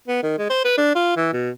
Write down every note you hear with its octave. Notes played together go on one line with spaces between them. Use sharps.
B3
D#3
G#3
C5
B4
D4
F4
E3
B2